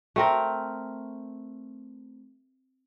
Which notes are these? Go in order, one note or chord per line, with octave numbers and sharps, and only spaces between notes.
A3 C4 A#4